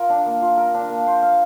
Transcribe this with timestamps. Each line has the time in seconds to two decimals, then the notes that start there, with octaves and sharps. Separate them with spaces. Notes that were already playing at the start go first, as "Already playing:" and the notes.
Already playing: F4 A#4
0.10 D4
0.26 A#3
0.42 F4
0.58 A#4
0.74 D4
0.90 A#3
1.07 C5
1.23 F5